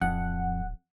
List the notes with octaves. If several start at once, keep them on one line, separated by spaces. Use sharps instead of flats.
D1 F2 F#5